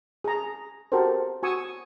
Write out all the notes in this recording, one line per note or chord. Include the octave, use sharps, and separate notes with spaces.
G#4 A#5
F#4 G4 A4 A#4 C5
F#4 G#5 C#6 D#6 E6